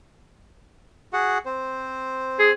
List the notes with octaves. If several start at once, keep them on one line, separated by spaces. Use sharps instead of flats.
F#4 G#4 F#5
C4 C5
G#4